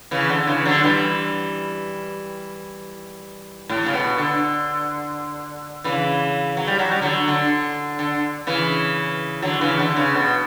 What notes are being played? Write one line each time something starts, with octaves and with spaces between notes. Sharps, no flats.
C#3 E3
D3
C#3 E3
D3 F#3
E3 G3
A2
C#3
B2
D3
C#3 E3
F#3
G3
F#3
G3
D3 F#3
D3
D3
C#3 E3
D3 F#3
C#3 E3
D3
C#3
B2